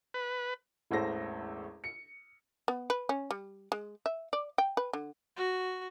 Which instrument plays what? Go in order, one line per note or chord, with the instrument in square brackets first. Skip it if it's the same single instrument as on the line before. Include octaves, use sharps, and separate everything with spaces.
[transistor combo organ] B4
[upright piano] E1 A1 E2 A4 C5 A#6
C#7
[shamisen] B3
B4
C#4
G3
G#3
E5
D5
G5
B4
D3
[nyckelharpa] F#4